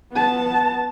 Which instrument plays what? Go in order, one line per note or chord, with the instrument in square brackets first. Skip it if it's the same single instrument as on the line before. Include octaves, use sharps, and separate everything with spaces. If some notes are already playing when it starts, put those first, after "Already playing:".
[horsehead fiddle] B3 A5